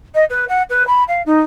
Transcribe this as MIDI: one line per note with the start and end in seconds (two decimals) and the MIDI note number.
0.14 0.24 75
0.29 0.45 71
0.48 0.62 78
0.69 0.85 71
0.87 1.03 83
1.08 1.22 77
1.26 1.40 63